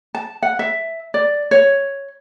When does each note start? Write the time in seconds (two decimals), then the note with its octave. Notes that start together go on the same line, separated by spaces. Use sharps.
0.15 A5
0.43 F#5
0.59 E5
1.14 D5
1.51 C#5